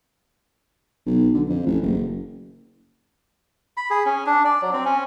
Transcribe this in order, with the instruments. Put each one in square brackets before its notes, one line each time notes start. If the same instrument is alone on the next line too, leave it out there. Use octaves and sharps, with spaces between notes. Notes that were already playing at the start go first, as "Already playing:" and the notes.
[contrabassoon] B1
D3
F2
A1
F#1
[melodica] B5
G#4
C#4
D4
D5
F#3
C4
C#4